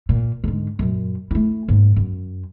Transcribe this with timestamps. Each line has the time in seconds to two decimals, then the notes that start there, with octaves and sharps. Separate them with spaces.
0.09 A#2
0.44 G#2 D3
0.79 F#2 A#2
1.31 A3 E4
1.68 G#2 A#3
1.96 F#2